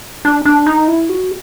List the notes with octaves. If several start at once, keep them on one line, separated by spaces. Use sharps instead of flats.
D4
D4
D#4
E4
F#4